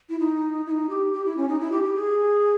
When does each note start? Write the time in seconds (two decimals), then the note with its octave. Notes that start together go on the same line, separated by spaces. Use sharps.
0.10 E4
0.20 D#4
0.66 E4
0.71 D#4
0.90 G4
1.13 G4
1.26 E4
1.37 C#4
1.49 D#4
1.60 E4
1.72 G4
1.83 G4
1.95 G#4